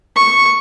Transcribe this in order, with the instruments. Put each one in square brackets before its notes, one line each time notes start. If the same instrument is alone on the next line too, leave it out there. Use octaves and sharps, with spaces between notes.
[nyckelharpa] C#6